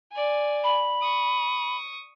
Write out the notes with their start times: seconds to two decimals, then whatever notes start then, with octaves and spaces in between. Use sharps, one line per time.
0.12 D5 G#5
0.64 B5
1.02 C#6 D#6